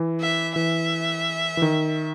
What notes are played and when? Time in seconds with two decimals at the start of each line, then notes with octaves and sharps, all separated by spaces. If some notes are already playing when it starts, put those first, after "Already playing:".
Already playing: E3
0.21 E5
0.56 E3 E5
1.57 E3
1.62 D#3